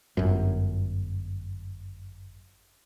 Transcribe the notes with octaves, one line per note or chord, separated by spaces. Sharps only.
G1 F#2